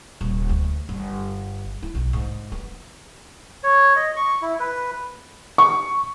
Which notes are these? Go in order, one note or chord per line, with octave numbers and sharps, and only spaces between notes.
D#1
D2
G1
E4
B1
G#2
B3
C#5
D#5
C#6
E4
B4
C#6